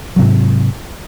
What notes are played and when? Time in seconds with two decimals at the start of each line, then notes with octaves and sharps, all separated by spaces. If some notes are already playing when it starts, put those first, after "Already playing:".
0.16 F#3
0.19 C3
0.22 G#2